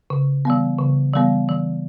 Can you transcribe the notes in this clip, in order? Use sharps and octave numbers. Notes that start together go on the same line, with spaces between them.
C#3
E3 G3 B3
C#3
E3 G3 B3
E3